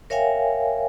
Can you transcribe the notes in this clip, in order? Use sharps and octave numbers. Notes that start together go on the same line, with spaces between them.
A#4 C#5 E5 F5 G5 G#5